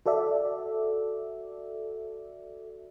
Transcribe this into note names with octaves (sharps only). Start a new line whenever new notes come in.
F#4 A4 D5 E5